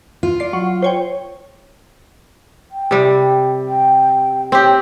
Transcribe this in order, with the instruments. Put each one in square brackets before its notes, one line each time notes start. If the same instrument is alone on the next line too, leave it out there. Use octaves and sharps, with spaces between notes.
[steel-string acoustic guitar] F4
[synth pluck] D5 C7
F#3
C5 C#5 G5
[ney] G5
[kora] C3 G3
[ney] G5
[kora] C4 G4 [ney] C#5